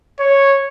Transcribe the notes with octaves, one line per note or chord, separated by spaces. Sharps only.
C#5